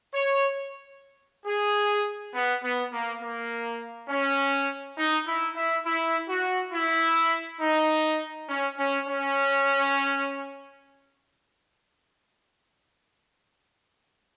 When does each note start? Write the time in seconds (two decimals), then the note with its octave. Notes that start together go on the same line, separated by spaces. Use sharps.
0.15 C#5
1.46 G#4
2.34 B3
2.63 B3
2.93 A#3
3.22 A#3
4.09 C#4
4.98 D#4
5.27 E4
5.57 E4
5.86 E4
6.29 F#4
6.73 E4
7.61 D#4
8.49 C#4
8.78 C#4
9.07 C#4